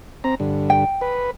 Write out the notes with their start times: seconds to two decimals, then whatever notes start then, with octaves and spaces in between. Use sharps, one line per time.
0.24 C4 A#5
0.40 G2 D3
0.70 G5
1.01 B4